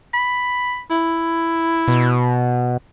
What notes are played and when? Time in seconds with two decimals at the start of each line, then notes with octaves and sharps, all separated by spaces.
0.14 B5
0.91 E4
1.88 B2